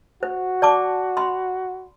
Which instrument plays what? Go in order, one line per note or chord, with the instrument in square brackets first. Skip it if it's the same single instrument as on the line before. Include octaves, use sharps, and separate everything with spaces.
[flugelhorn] F#4 [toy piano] C5
[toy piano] D5 A5 D6
B5 C6